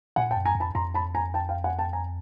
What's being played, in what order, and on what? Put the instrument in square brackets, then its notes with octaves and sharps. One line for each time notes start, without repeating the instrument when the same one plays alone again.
[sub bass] A#2 [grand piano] F#5 G#5
[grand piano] G5 A5
[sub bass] F#2
[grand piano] G#5 A#5
[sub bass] F2
[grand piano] A5 B5
[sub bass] F2 [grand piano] A#5 C6
[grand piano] A5 B5
G#5 A#5
G5 A5
F5 G5
F#5 G#5
G5 A5
G#5 A#5